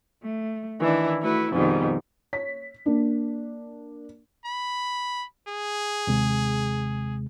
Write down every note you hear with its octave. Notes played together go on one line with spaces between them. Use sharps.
A3
D#3 E3 D4 E4
A3 E4 F#4 B4
F2 G#2 B2 D#3 G3
C#5 B6
A#3 D4
B5
G#4
D#2 C3 G#3